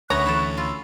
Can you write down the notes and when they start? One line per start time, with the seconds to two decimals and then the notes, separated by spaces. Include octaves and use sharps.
0.10 D2 B3 C#4 C#5 E5 A#5 C#6 F#6
0.26 E3 E4 A4
0.57 F4 B5 E6